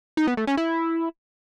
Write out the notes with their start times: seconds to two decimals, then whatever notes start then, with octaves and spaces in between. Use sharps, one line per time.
0.17 D#4
0.27 B3
0.37 A3
0.47 C#4
0.57 E4